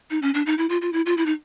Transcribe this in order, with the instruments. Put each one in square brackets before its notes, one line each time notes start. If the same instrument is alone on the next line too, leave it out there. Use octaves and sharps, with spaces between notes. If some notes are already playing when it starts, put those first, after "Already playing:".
[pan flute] D#4
C#4
D4
D#4
E4
F4
F4
E4
F4
E4
D#4